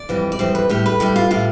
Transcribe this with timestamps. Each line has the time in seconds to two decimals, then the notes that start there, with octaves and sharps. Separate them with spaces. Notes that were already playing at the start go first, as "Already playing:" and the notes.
Already playing: D5
0.09 F2 E3 G3
0.32 D5
0.39 F2 E3 G3 C5
0.55 B4
0.69 A2 G3 G4
0.86 B4
1.00 A2 G3 G4
1.16 F4
1.31 A2 G3 F4